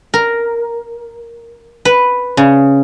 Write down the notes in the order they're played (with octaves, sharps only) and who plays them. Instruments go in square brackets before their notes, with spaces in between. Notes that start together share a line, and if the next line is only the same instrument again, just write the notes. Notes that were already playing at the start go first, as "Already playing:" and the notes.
[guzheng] A#4
B4
C#3